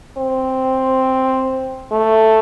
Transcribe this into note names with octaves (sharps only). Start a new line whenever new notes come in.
C4
A3